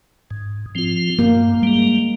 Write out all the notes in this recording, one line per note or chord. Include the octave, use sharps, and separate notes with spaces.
G#2
F3 C4 F4
G2 A#3
G3 G#3 A#3